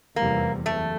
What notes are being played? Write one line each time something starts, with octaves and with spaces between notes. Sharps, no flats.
F1 E2 C3 E3 G3 A#3
F#1 E2 A3